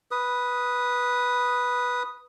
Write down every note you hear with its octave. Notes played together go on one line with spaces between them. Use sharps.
B4 D#6